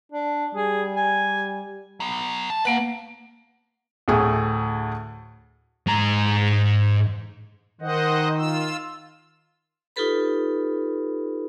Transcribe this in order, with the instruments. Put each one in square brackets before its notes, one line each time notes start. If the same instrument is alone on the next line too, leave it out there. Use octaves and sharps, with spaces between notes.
[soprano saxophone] D4
[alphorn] G3 [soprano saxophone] G#4
[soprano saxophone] G#5
[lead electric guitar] F#3 B3
A5
[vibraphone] A#3 F#5 [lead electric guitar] B4 F5
[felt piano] D2 A2 G#4
[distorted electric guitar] G#2 A#5
[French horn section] D#3 [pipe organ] C5 D#5 F#5
[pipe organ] F4 E6
[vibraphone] D#4 F4 G4 A4 B4 B5